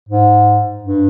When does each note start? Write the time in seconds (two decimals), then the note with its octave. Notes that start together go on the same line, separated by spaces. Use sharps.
0.09 G#2
0.84 G2